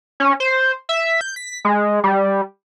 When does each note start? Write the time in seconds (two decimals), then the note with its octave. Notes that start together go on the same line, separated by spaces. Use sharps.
0.20 C#4
0.40 C5
0.89 E5
1.21 G6
1.36 B6
1.65 G#3
2.04 G3